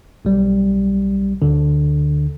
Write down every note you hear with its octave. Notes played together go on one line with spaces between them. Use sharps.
B1 G3
D2 D3